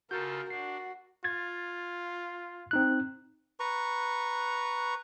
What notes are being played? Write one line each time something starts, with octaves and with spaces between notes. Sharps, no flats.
C#3 F4 F#4 A4 A#4 G6
D4 F#4 C7
F4 G#6 A6
C4 D#4 F#6
B4 A#5 C#6